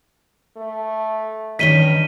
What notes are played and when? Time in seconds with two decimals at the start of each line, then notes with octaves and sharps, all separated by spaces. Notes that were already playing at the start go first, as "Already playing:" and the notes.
0.57 A3
1.59 G2 D#3 C#4 D#4 B6 D#7 G7